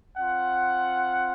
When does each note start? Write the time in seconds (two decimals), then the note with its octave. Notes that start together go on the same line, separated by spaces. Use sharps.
0.17 C4 F4 F#5